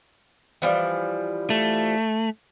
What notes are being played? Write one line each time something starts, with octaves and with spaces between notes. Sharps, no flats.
E3 F3 G3
A3